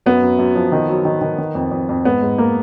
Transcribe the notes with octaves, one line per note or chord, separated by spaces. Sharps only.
F#2 B3
F#2
F#2
F3
D#3
F#3
D#3
D#3
D#3
F2
F2
F2
G#2 B3
G#2
A#3